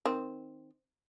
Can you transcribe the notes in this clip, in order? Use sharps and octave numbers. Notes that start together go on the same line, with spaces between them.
D#3 C4